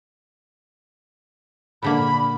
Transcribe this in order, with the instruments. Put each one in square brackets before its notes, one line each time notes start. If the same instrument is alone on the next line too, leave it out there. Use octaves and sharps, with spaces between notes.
[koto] A#2 D3 A#3 [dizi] B5